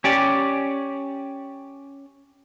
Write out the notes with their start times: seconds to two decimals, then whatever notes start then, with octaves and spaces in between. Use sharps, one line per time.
0.04 C#4 G4 D5